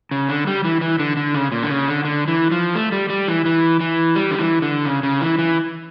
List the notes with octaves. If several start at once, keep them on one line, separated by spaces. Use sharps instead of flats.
C#3
D3
G3
E3
E3
D3
D3
C#3
A#2
D3
C#3
D3
D3
E3
F3
A3
G3
G3
E3
E3
E3
G3
D3
E3
D3
C#3
C#3
E3
E3